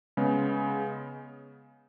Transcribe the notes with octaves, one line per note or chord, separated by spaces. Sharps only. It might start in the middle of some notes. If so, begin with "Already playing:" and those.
C#3 G#3 B3